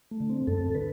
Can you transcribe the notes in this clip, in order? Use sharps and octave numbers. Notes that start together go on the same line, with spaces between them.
A3
D3
C4
F#2 A4
D3 B4